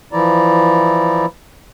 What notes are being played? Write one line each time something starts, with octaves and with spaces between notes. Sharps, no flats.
E3 F3 E4 D5 A#5